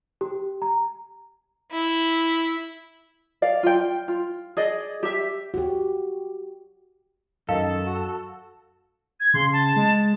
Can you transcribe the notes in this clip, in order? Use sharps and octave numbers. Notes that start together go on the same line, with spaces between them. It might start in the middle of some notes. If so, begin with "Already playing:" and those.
G4
A#5
E4
D5 F5
F4 G5
F4
G#4 D5 D#5
G4 E5
F#4 G4
F#2 D#3 A4 F5
F#4
G#6
C#3 C6
A5
G#3